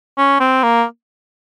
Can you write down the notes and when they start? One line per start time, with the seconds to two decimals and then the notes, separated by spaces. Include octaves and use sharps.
0.18 C#4
0.40 C4
0.63 A#3